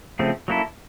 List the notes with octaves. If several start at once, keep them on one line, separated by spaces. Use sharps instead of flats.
C#3 F3 A3 C4
F#3 A#3 C#4 E4 A4